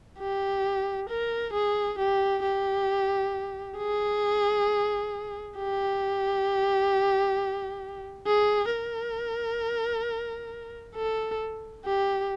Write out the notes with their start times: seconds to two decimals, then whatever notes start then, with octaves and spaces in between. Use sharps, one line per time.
0.19 G4
1.09 A#4
1.53 G#4
1.98 G4
2.43 G4
3.78 G#4
5.57 G4
8.27 G#4
8.71 A#4
10.95 A4
11.85 G4